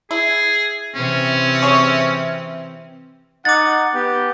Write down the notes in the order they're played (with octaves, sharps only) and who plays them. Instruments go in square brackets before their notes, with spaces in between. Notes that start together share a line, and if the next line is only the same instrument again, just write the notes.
[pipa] E4 [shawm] G#4
[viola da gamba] C3 E3 C4 [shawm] C#4
[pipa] G#4 C#5
[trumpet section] D#4 F#5 [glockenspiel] D6 A6
[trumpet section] B3 G4